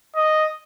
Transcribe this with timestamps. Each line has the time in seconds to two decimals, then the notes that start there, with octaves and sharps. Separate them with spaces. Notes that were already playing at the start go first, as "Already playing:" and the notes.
0.16 D#5